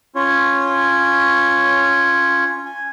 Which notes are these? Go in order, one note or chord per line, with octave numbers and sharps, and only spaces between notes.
C#4 F4 C#5
G#5